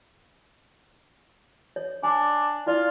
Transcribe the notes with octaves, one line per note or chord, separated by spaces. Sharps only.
C#5
D4 G#5
E4 F4 D5